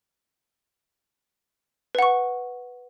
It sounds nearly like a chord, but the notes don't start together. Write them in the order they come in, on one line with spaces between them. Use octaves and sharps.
B4 F#5 C#6